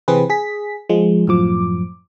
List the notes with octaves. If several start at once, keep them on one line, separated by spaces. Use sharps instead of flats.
C3 E3 C4 G#4 B4
G#4 B6
F3 G#3
F#2 A2 F3 D6